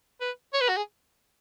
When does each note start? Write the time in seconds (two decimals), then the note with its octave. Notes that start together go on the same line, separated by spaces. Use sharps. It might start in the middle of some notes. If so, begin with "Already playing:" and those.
0.21 B4
0.54 C#5
0.61 B4
0.69 F#4
0.77 G#4